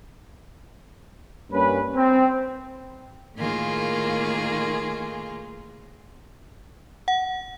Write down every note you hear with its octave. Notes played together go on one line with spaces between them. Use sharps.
G2 A#3 C#4 B4
C4
A2 D#3 A#3 F4 G#4
F#5